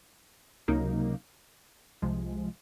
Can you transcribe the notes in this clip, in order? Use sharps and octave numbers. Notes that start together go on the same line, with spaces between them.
C#2 C3 F#3 A#3 D#4
C2 C3 F3 G#3